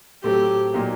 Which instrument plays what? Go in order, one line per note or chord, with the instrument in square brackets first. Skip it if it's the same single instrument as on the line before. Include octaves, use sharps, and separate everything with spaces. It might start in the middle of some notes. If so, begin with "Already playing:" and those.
[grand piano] A2 F#3 A3 C4 [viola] G4
[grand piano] A#2 F#3 A#3 D#4 G4